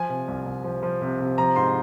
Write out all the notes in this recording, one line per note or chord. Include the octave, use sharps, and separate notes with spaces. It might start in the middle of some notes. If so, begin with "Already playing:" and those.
Already playing: F3 G#5
C3
C2
C2
F3
F3
C3
C3
F3 A#5
G#2 C6